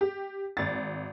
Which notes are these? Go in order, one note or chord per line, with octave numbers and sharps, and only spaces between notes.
G4
G#1 A6